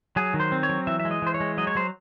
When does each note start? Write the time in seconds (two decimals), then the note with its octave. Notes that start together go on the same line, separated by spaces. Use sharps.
0.16 F#3 G#4
0.34 D#3
0.40 C5
0.52 C4
0.63 C#5
0.69 F#3
0.87 E3 E5
1.00 E5
1.05 G#3
1.11 D#5
1.22 E3 C5
1.34 C#5
1.40 G#3
1.58 F#3 D#5
1.67 C#5
1.75 F#3 C5